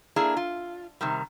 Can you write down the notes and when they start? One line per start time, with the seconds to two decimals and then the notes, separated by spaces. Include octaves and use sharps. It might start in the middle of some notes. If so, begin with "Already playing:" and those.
0.16 A#3 D4 E4 G#4
0.37 F4
1.01 C3 D#3 G3